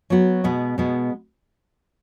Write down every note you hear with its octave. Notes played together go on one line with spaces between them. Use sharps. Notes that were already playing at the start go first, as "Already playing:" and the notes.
F#3 B3 F#4
B2 G#3 B3
B2 G#3 B3